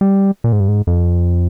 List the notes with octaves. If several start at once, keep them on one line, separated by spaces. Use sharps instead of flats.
G3
A#2
G#2
G2
G#2
F2